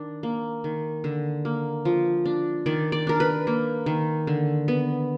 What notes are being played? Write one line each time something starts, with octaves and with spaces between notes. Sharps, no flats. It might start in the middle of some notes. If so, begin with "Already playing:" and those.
Already playing: D#3 D4
A#3
D#3
D3
A#3
F3
D4
D#3 D5
D5
D4 A#4
B4
A#3
D#3
D3
B3